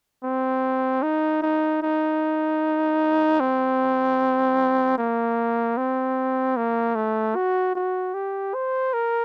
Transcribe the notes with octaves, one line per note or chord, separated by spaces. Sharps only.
C4
D#4
D#4
D#4
C4
A#3
C4
A#3
A3
F#4
F#4
G4
C5
A#4